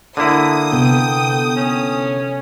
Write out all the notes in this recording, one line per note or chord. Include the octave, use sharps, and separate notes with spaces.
D3 A#3 E4 D#6
C3 B3 A4 G5
C#4